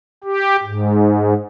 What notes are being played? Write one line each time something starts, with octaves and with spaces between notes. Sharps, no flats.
G4
G#2